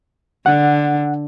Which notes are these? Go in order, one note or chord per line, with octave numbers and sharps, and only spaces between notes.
D3 F#5